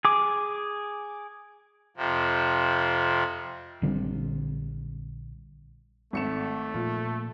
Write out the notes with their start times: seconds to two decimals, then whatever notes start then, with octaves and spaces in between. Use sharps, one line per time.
0.05 G#4 D6
1.97 F2 C3 F3
3.82 A#1 D3 G3 C4
6.13 G#1 A3 C#7 E7
6.74 A#2 F3 A#3 F4